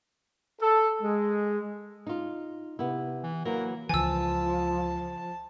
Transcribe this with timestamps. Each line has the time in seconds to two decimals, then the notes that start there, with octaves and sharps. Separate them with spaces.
0.61 A4
1.02 G#3
2.07 D#4 F4
2.79 C3 B3 E4
3.24 E3
3.45 E3 F#3 A#3 A#4
3.89 C#2 E3 F3 G#5 A5 E6